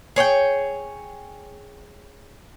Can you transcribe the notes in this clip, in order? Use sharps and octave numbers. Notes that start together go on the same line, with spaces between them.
G#4 C#5 F5 G5